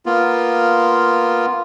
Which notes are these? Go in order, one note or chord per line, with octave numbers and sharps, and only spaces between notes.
A#3 B3 F4